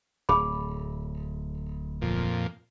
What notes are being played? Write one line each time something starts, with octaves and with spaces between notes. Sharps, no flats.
D1 G#4 B5
F2 A#2